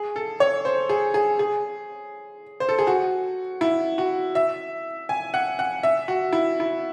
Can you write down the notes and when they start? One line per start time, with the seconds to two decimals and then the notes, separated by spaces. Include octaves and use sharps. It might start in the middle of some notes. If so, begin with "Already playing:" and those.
Already playing: G#4
0.16 A4
0.40 C#5
0.65 C5
0.89 G#4
1.14 G#4
1.39 G#4
2.60 C5
2.69 A4
2.79 G#4
2.87 F#4
3.61 E4
3.98 F#4
4.35 E5
5.09 G#5
5.34 F#5
5.59 F#5
5.83 E5
6.08 F#4
6.33 E4
6.60 E4